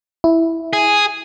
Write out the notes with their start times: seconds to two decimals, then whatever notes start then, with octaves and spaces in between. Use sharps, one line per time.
0.24 E4
0.73 G#4